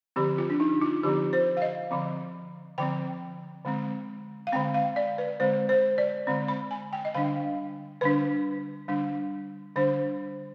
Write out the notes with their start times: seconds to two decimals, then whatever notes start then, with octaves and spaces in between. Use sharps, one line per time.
0.16 D3 F3 C4 G4
0.38 F4
0.50 D4
0.60 D#4
0.82 F4
1.03 D3 F3 C4 G4
1.33 C5
1.57 F5
1.62 D#5
1.91 D3 F3 C4
2.78 D3 F3 C4 G5
3.65 D3 G#3 C4
4.47 F5
4.52 D3 G#3 C4 G5
4.74 F5
4.96 D5
5.18 B4
5.40 D3 G#3 C4 C5
5.69 C5
5.98 D5
6.27 D3 G#3 C4
6.48 B5
6.71 G#5
6.93 G5
7.05 D#5
7.14 D3 G3 D4 F5
8.01 D3 G3 D4 B4
8.88 D3 G3 D4
9.76 D3 G3 D4 C5